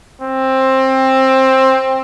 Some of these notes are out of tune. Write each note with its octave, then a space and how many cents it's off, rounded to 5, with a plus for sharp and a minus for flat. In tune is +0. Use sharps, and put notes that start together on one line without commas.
C4 +15